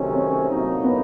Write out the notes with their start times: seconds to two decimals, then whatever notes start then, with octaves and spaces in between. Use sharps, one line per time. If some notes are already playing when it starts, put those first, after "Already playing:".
Already playing: C3 D#3 F#3 A3 C#4
0.14 C4
0.49 A2 F#3 A#3 D#4
0.84 B3